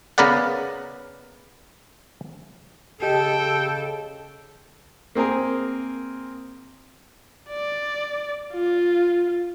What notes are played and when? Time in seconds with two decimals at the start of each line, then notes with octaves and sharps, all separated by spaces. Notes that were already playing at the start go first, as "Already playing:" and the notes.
0.18 C#3 B3 A#4 B4 D5 F#5
3.03 C#3 G4 A4 D#5 G5
5.15 A#3 C4 G#4 A#4
7.50 D5
8.53 F4